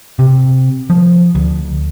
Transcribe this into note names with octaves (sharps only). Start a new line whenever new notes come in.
C3
F3
D2